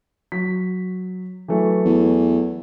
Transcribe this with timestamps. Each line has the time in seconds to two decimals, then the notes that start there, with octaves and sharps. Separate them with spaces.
0.32 F#3 B6
1.48 E3 F#3 A3
1.85 E2